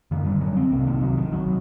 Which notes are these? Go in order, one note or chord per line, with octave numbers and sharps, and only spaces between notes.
F#2 D3 D#3
G3
F#3
C4
C2 C3 A#3
D#3
F#3
D#3
C2 C3 F#3